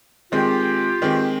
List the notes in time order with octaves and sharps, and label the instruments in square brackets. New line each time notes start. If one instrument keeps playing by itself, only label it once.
[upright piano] D#3 G#3 C4 [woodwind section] F4 G4
[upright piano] D#3 G#3 C4